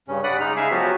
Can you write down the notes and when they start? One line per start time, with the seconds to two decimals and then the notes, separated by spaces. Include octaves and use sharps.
0.08 G2 C#3 C#4
0.24 D5 F#5 B5 D#6 F#6
0.40 C#3 G#3 D#4 F6
0.56 C#3 G#3 G#4 E5 F5 G#5
0.71 F3 F#3 B3 F#4 G4